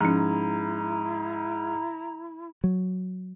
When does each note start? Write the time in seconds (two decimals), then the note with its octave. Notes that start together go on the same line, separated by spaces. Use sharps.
0.01 G#2 F3 C#4 E4 A#5
2.64 F#3